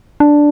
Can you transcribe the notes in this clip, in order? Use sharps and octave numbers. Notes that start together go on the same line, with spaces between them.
D4